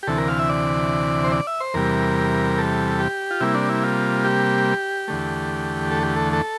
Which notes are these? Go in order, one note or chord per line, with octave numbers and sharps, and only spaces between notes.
G4
D2 C3 E3 A4
A#4
F5
E5
D5
C5
D5
E5
C5
E2 C3 G3 A#4
A4
G4
F4
C3 G3 A#3 E4
D4
E4
F4
G4
E2 D3 A3
A4
G4
A4
A4